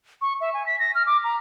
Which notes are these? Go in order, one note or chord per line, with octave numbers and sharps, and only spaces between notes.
C#6
E5
G#5
B6
A#6
F6
D6
A#5